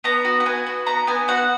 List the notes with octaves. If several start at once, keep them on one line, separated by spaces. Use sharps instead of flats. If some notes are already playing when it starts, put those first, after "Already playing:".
B3 A#5
F#4
F#5
B3 G#5
F#4
B3 A#5
B3 G#5
F#4 F#5